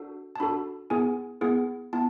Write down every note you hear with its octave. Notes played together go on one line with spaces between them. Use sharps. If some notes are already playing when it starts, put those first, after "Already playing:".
Already playing: D4 F#4 A4
A5
D4 F#4 A4 B5
B3 E4 G#4 G#5
B3 E4 G#4
B3 E4 A5